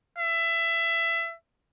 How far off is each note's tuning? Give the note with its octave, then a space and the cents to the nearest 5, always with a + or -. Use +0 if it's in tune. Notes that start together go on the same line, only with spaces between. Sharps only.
E5 +20